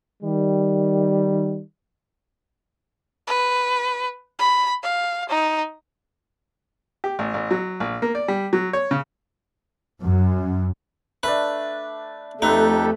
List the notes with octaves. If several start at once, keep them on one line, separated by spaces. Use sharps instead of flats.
D#3 G3
B4
B5
F5
D#4
G4
A1
A1
F#3
A#1
A#3
D5
G3
F#3
C#5
C#3
F#2
A3 D4 B4
F2 A3 D#4 G4 A4 B4 E5 F#5